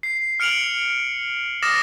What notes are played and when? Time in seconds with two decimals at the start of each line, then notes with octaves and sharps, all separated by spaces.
0.03 C7
0.40 F6 C#7 D7 F7 F#7
1.62 D6 D#6 F6 A6 A#6 E7